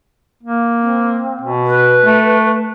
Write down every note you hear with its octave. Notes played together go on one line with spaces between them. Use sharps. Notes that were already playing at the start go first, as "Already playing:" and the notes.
A#3
C4
B2
B4
A3